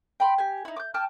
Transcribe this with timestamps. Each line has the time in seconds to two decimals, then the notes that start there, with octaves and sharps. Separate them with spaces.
0.20 G5 B5 C6
0.38 G4 G#5
0.65 D#4 E4
0.77 D6 G6
0.94 G5 A5 D6 F6